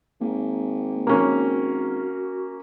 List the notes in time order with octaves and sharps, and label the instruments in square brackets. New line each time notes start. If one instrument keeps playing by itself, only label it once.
[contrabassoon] G#1 [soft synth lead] A#3
[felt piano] A#3 C#4 [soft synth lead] F#4